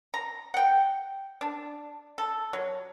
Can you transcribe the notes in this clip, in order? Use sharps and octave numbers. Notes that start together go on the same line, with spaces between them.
A#5
F#5 G5
D4
A4
F#3